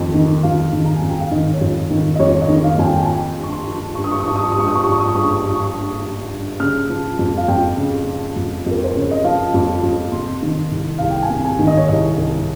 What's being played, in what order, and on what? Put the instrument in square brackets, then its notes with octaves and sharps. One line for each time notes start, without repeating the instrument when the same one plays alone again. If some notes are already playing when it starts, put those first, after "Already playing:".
Already playing: [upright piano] F2 D#3
D#3
F2 F5
D#3
A#5
F2 G#5
G5
F5
D#3 D#5
C#5
F2
D#3
D#5
F2 C#5
D#5
D#3
F5
F2 G#5
G5
G#5
F3 G5
G2
C#6
C6
F3
G2 C#6
D#6
C#6
D#6
F3 C#6
D#6
C#6
G2 D#6
C#6
D#6
C#6
F3 D#6
C#6
D#6
C#6
G2 D#6
C#6
D#6
F3 C#6
D#6
C#6
D#6
G2 C#6
F3
G2
C#3 F6
F3
F2
F5
F2 G5
C#3
F3
F2
F2 A#4
C5
C#3 C#5
D#5
F3 F5
F2
F2
C3 C6
D#3
C2
C2 F5
G5
G#5
C3
G#5
D#3
D#5
C#5
C2 D#5
C2